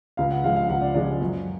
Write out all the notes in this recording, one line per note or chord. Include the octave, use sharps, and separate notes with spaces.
C#2 F5
F#5
C#3 F3 G#3 F5
F5
C#2 F#5
D5
C#3 F3 G#3 D5
F#2